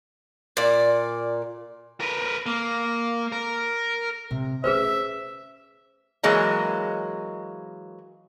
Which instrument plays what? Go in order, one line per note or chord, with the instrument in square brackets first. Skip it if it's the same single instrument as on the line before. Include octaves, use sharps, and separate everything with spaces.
[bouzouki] A#2 D5
[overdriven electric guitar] A#4 B4
A#3
A#4
[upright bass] C3
[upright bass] A3 C#4 [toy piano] G#4 B4 C5 [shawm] E5
[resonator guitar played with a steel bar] E3 F#3 G#3 A#3